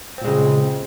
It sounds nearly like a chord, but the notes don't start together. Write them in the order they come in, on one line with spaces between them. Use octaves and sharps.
C4 A#2 G#3 C#3